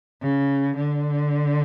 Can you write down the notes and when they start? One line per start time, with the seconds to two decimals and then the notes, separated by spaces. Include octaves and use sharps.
0.21 C#3
0.76 D3